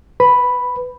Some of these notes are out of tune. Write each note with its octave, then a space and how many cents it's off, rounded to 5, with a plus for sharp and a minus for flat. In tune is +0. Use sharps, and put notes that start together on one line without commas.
B4 +10 B5 +0